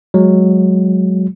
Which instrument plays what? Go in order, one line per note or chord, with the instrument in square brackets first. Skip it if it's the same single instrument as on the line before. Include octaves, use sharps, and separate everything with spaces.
[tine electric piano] F#3 G#3